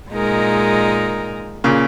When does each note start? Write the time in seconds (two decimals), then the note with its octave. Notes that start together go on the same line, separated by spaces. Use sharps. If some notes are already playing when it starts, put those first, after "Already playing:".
0.11 A#2 G#3 D#4 A#4
1.64 A#2 C#3